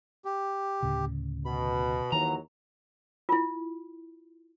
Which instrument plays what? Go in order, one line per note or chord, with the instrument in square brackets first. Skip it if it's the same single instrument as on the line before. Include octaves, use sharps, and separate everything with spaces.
[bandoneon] G4
[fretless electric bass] D2 A2 C#3
[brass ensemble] B2 [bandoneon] B5
[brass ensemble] D#2 E3 F#3 [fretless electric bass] D#3 [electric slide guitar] A#5
[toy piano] E4 F4